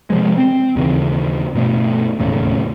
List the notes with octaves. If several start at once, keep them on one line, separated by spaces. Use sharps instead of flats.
C3 F3 G#3
C4
D#2 C#3 E3
G2 B2 A3
E1 D#2 A2 C#3